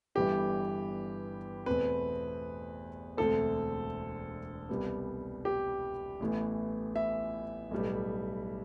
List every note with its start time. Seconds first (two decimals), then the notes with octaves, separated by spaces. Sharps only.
0.15 G1 G2 E3 B3 G4
1.66 E2 B2 A3 C4 B4
3.17 E1 D2 D3 A3 C4 A4
4.69 C2 B2 G3 B3
5.45 G4
6.20 A1 A2 E3 B3
6.96 E5
7.71 B1 A2 G3 B3